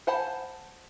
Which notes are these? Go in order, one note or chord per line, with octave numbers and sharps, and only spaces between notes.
C5 F#5 G#5 A5 B5